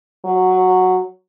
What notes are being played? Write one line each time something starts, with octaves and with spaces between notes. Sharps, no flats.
F#3